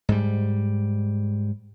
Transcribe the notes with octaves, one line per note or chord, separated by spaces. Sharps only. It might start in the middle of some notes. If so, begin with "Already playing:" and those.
G#2 G3